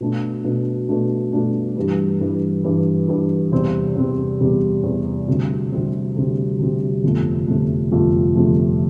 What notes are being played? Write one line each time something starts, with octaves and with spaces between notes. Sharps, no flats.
B2 A3 D4
B2 A3 D4
B2 A3 D4
B2 A3 D4
G2 E3 G3
G2 E3 G3
G2 E3 G3
G2 E3 G3
E2 C3 G3 C4
E2 C3 G3 C4
E2 C3 G3 C4
E2 C3 G3 C4
D2 C3 G3 C4
D2 C3 G3 C4
D2 C3 G3 C4
D2 C3 G3 C4
G1 F2 C3 F3 A3
G1 F2 C3 F3 A3
G1 F2 C3 F3 A3
G1 F2 C3 F3 A3